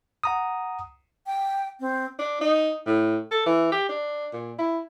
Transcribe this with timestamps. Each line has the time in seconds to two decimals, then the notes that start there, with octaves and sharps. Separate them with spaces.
0.24 F#5 A#5 D#6
1.26 G5
1.80 C4
2.19 D4
2.41 D#4
2.86 A2
3.31 A4
3.46 E3
3.72 G4
3.89 D4
4.33 A#2
4.58 E4